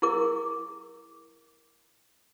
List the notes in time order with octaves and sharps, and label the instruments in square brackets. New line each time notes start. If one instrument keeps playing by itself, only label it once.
[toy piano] E4 G#4 A#4 D6